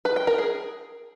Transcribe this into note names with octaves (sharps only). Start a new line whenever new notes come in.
B4
G5
A#4
G#4